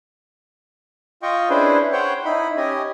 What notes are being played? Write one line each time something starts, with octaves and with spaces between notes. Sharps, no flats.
F4 D#5 G5 C#6
C#4 D4 E4 G#4 B4 C5
C5 C#5 F#5 G5
D#4 E4 B5
C#4 G4 D#5 G#5